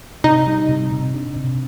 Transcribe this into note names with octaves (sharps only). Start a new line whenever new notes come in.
C3 D#4
G3
C3
C3
D4
C3